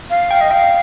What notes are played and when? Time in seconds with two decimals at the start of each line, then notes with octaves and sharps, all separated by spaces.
0.10 F5
0.31 G5
0.41 D#5
0.51 F5 G5